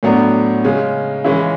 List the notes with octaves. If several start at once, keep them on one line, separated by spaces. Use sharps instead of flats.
A2 F#3 B3 D4
C#3 G#3 C#4
C#3 E3 G#3 C#4 E4